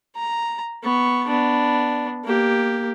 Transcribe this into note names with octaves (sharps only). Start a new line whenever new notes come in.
A#5
B3 C#6
B3 D4
A#3 G4